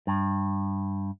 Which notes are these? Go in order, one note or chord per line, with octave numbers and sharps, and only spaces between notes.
G2